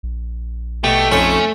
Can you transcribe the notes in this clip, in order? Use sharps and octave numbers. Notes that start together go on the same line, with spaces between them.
A#1
B2 A3 G4
F2 C#4 D#4 C#5